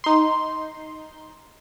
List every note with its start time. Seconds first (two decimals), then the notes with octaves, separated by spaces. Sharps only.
0.04 D#4 C6